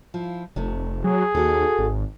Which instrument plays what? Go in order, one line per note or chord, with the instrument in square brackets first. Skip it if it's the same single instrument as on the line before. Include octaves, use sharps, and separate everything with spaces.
[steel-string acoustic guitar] F3 E4 F4
[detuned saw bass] F1 [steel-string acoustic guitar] C3 A3
[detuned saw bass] F#3 [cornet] G#4
[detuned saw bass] D#2 [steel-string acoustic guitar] F#4 A4
[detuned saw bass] G#1